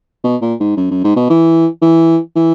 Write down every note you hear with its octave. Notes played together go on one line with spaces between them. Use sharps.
B2
A#2
G#2
F#2
F#2
G#2
B2
E3
E3
E3